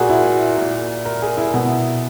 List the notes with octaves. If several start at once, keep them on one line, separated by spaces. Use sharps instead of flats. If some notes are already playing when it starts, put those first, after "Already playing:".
Already playing: A#2 F#4 G#4 A#4
E4
A#2
A#4
G#4
E4
B2